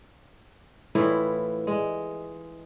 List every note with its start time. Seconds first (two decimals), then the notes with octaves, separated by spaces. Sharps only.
0.95 A2 E3 E4 F4
1.67 G#3